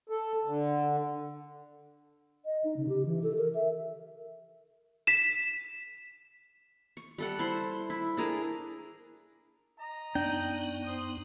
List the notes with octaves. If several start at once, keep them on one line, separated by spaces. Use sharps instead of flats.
A4
D3
D#5
D#4
C#3
G4
E3
A4
A#4
E5
B6 E7
C#6
G3 A4 F#5
E4 C5
E4
D4 G#4 A#4
D#5 A#5
F#2 B3 D4 D#4 G5
C5 D#6